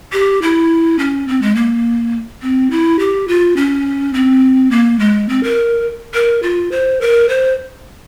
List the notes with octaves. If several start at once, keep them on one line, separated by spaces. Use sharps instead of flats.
G4
E4
C#4
C4
G#3
A#3
C4
E4
G4
F4
C#4
C4
A#3
G#3
C4
A#4
A#4
F4
C5
A#4
C5